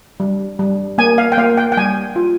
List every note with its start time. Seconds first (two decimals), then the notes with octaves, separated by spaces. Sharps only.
0.20 G3
0.59 G3
0.98 A#3 G#5
1.18 F5
1.32 G5
1.38 A#3 F5
1.57 G5
1.72 G5
1.77 G3 G#5
2.16 F4